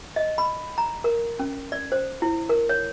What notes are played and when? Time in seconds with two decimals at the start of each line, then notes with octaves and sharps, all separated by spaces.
0.16 D#5
0.38 B5
0.78 A#5
1.04 A#4
1.39 C#4
1.72 D5
1.92 C5
2.22 E4
2.49 A#4
2.69 C#5